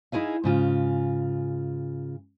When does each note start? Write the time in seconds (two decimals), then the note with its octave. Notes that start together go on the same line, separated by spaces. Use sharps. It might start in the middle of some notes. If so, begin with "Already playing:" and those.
0.12 D#4 E4 G#4 B4 F5
0.44 G#2 C#3 F4